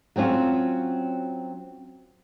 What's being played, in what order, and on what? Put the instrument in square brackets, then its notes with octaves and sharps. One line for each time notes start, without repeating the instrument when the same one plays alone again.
[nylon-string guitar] F#3 C4 C#4 F4 F#4